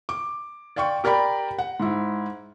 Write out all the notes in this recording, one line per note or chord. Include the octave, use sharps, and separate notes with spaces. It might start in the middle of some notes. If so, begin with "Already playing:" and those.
D6
D5 F5 G5 C6 C#6
G4 A#4 D5 G5 B5
F#5
G#2 E4